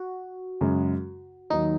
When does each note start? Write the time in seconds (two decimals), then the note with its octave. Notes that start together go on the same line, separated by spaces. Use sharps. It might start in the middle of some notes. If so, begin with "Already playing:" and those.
Already playing: F#4
0.61 F#2 C#3 G#3
1.50 D#2 D#3 F#3 D#4